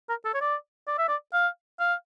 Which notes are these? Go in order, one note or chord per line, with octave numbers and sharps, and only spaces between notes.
A#4
A4
C#5
D5
D5
E5
D5
F5
F5